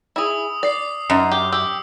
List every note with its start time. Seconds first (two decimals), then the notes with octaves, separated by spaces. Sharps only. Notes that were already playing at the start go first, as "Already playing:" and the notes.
0.16 E4 G#4 D#6 E6
0.63 D5 D#6 C7
1.10 F#2 D#4
1.32 G4
1.52 G4 E6